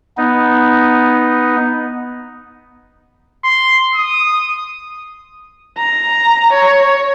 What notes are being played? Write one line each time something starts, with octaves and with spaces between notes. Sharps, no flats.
B3 D#4
C6
D#6
A#5
C#5